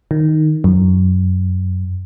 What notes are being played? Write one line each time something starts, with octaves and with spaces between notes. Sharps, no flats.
D#3
F#2